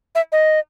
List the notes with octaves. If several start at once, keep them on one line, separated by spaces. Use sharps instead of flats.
E5
D#5